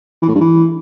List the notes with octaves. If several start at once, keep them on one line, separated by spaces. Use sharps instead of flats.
E3
A2
G2
E3